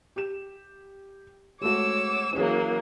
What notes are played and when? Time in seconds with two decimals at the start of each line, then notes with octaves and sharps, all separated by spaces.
0.16 G4 E7
1.61 G#3 A3 F#4 C#5 D6 E6
2.33 E3 F#3 A#3 C#4 G#4